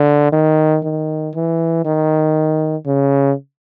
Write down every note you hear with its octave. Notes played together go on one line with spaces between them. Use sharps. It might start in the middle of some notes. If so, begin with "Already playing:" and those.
Already playing: D3
D#3
D#3
E3
D#3
C#3